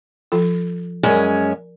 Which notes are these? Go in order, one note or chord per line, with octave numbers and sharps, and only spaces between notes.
F3 F4 A4
F#2 G#3 C#4 A#4 D5 G#5